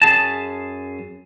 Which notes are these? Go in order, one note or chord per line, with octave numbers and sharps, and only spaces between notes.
F#2 G#4 A5